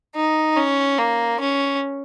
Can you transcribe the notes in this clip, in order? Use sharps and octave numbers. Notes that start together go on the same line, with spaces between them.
D#4
C#4
A#3
C#4